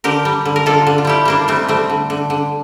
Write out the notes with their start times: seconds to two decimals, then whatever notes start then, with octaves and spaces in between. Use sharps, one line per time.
0.04 D3 G4 A#4
0.25 G3
0.45 D3
0.56 A#4
0.66 D3 F4 A4
0.87 D3
0.98 F4
1.05 G3 E4 G4
1.25 G3 A#3 D4
1.48 G3 A3 C4
1.68 G3 A3 C4
1.90 D3
2.10 D3
2.30 D3